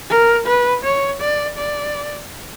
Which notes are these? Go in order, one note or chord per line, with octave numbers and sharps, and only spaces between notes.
A#4
B4
C#5
D5
D5